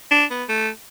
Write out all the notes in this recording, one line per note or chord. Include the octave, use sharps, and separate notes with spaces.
D4
B3
A3